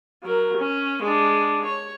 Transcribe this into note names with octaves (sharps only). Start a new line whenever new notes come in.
F#3 A#4
C#4
G#3 D4
C#5